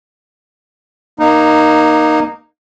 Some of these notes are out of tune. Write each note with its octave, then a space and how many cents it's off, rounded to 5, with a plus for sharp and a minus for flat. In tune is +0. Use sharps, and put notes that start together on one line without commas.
A#3 +10 D#4 -10